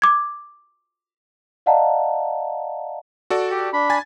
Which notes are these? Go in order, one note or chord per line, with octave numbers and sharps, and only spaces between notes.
D6 G#6
D5 D#5 F5 F#5 A5 A#5
F#4 A4 D5
G4
D4 B5
G#5 A6